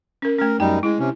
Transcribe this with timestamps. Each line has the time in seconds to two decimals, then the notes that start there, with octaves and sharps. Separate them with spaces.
0.22 C#4 A#4
0.38 A3 C#4 A#4
0.60 F#2 G3 D#4 G5
0.83 G#3 E4
0.99 C3 C#4